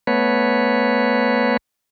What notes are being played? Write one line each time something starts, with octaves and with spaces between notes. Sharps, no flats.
A3 B3 B4 C#5